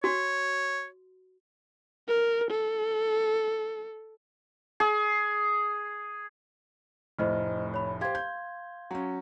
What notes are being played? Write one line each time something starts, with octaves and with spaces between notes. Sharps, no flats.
F#4 C#5
A#4
A4
G#4
F1 A2 C5 D#5 F6
C#5 B5
G4 C5 F5 C6 G#6
G6
F#3 C#4